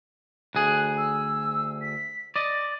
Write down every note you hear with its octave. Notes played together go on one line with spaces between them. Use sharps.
D2 G#4 F#6
E6
B6
D5 D#5 A6